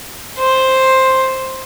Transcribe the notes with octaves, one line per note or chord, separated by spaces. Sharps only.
C5